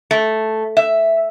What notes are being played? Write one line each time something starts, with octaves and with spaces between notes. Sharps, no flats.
A3
E5